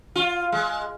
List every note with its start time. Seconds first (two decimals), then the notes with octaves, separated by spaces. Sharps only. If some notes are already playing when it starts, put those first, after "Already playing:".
0.16 F4
0.52 G#3